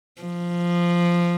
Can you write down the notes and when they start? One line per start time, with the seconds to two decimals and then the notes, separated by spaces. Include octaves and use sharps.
0.22 F3